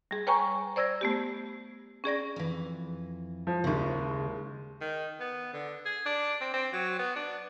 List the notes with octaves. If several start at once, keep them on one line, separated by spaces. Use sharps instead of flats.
G3 G#4
B4 C#5 G5 G#5 A#5 C#6
C5 D5 E6 G#6 A#6
A3 B3 G4
C#4 G#4 D5 A#6
F2 E3
F3
F#1 D#2 C#3 G#3
D#3
B3
D3
G#4
D4
C4
C4
F#3
B3
D4